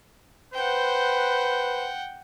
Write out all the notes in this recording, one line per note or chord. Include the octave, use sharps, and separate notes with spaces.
B4 C5 F#5 G5